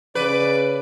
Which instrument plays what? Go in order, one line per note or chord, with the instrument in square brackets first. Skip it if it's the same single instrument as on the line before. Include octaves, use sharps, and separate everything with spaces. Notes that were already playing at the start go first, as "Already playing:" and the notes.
[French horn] C#3 [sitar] B4 [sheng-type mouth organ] D5 D6